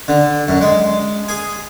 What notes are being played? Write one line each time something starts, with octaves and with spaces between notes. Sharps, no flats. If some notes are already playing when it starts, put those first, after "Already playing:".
D3
F#2
G#3
G#4